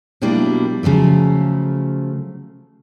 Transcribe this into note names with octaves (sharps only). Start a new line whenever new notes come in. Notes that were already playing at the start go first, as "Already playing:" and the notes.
B2 F#3 G3 A#3 D4 E4
C#3 F3 F#3 A3